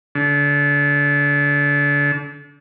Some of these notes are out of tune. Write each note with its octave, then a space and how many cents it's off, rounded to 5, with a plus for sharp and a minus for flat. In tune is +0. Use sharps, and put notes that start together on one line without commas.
D3 -35